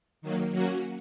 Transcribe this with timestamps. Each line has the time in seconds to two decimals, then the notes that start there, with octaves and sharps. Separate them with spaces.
0.22 D#3 F#3 A#3
0.52 F#3 A#3 C#4 F#4